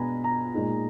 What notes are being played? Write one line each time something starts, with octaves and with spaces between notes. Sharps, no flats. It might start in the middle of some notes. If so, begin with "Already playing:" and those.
Already playing: B2 G#3 B3 D4 G#5 A#5 B5
A#5
A#2 G#3 D#4